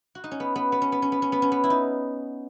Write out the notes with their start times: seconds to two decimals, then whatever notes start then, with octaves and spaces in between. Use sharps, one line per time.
0.15 F#4
0.24 D#4
0.31 C#4
0.40 B3
0.56 B3
0.72 B3
0.82 C#4
0.92 B3
1.02 C#4
1.12 B3
1.22 C#4
1.32 B3
1.42 C#4
1.52 B3
1.64 E4
1.70 D#4